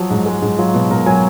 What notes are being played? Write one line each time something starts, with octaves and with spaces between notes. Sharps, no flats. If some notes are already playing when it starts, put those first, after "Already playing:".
Already playing: F3 F#3 F#4
G#2
G#3
G#2
F#3 F4
B2
B2 A#4
F#3 G#5